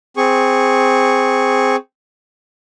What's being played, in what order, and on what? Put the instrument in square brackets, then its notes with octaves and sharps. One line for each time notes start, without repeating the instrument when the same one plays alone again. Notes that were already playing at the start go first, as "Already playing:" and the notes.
[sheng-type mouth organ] C4 G#4 C#6